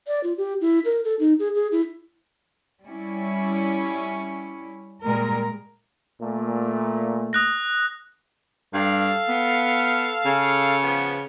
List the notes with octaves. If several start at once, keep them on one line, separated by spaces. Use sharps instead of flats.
D5
F4
G4
E4
A#4
A4
D#4
G#4
G#4
E4
G3 C#4 E4
A#2 G3 G#3 A#4
A#2 A3
D#6 F#6 A#6
G2 A4 F5
B3
C#3
F3 B3